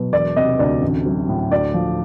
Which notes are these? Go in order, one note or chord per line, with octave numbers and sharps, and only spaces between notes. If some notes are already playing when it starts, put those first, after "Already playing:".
Already playing: B2 F#3
E1 D5
C3 D#5
D2 D5
A1
F#3
A2
D2 D5
F3